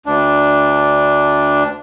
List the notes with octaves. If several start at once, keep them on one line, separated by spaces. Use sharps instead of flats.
D2 D4